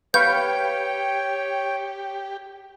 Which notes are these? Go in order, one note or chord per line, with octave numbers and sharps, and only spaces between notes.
G4 B4 C#5 F5 G5 C#6 G6